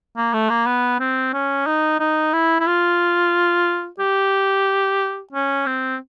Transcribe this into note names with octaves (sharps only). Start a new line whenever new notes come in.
A#3
A3
A#3
B3
C4
C#4
D#4
D#4
E4
E4
F4
G4
C#4
C4